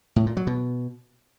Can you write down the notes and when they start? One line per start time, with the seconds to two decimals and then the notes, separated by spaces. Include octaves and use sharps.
0.16 A2
0.26 A#2
0.37 F#3
0.47 B2